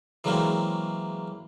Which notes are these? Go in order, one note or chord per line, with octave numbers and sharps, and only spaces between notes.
E3 F#3 G#3 A#3 C4 C#4